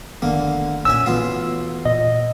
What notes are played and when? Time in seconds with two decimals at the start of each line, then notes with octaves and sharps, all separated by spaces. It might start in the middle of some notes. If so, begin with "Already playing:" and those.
0.22 F1 D3 D#3 A#3 B3
0.85 B1 A#2 C#4 E5 G#5 E6
1.06 B1 E3 A3 B3 F4
1.85 A#2 D#5